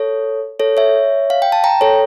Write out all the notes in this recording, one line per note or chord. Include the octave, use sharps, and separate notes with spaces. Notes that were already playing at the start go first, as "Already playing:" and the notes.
Already playing: A4 C#5
A4 C#5
C#5 E5
F5
G5
A5
G5 A#5
A4 C#5